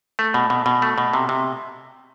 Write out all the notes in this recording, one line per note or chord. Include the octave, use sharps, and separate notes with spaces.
A3
B2
B2
B2
A3
B2
C3
C3